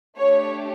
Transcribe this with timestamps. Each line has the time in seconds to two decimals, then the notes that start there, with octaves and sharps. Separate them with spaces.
0.17 A3 D4 G4 C#5